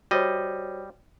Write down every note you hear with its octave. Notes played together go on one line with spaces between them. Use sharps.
G3 F#4 C5 C#5 D#5